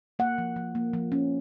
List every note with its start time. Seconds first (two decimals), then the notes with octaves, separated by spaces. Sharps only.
0.19 A#3 F#5
0.38 F3
0.56 F3
0.75 A#3
0.94 F3
1.12 C#4